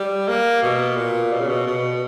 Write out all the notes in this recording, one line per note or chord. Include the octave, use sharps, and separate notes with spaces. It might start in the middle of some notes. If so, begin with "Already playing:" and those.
Already playing: G3
A#3
B2
A#2
B2
C#3
B2
B2